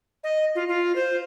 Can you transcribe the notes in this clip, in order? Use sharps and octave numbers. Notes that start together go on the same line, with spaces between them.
D#5
F4
F4
C5